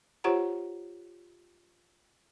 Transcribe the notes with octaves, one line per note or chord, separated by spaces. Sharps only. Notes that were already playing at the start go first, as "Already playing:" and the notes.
F4 G4 C5 C#5 F#5 A#5